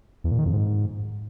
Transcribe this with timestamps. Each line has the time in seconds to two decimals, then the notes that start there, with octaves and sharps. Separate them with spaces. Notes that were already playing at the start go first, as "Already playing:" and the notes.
0.24 E2
0.31 A#2
0.39 D#3
0.46 F2
0.53 G#2